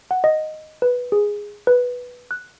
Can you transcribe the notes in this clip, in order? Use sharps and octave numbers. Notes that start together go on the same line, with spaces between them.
F#5
D#5
B4
G#4
B4
F#6